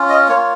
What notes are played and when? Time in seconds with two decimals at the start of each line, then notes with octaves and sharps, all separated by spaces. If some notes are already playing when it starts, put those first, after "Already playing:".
Already playing: C#4 F4
0.09 D#5
0.28 A#3 F4 C#5